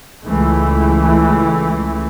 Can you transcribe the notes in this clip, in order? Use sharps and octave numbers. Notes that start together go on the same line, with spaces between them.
C#2 E3 A3